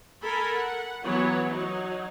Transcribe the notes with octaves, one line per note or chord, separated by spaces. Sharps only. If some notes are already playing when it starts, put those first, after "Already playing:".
A4 A#4 G#5 B5
F#5
E3 F#3 B3 C#5
F#3 D#4